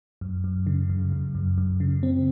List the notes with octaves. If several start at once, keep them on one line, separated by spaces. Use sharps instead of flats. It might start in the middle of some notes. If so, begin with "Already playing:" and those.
F#2
F#2
C#3
F#2
F#2
F#2
F#2
C#3
C4